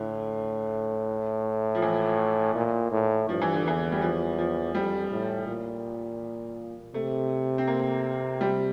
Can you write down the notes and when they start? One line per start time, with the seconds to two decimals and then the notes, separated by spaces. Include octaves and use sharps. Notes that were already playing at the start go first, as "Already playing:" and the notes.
Already playing: A2 D3
1.75 F3
1.82 E3
2.55 A#2
2.91 A2
3.29 G2 F3
3.42 E3
3.54 D3
3.65 E2 E3
3.92 G3
4.01 F3
4.38 F3
4.74 F2 G3
5.11 A2
5.47 A#2
6.94 C3 A3
7.58 C4
7.67 A#3
8.41 G3